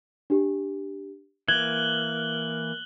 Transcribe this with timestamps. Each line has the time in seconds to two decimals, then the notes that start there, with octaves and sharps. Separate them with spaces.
0.30 D4 G4
1.48 E3 A#3 F#6 G#6 F#7 G7